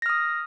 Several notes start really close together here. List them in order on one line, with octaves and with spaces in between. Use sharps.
A#6 F6 D#6